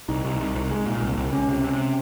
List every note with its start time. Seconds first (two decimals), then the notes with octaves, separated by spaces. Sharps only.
0.09 C2 D#4
0.25 C2
0.40 C2
0.55 C2
0.71 G#3
0.86 A#2
1.02 C2
1.17 C2
1.33 C#2 C#4
1.49 C3
1.64 C3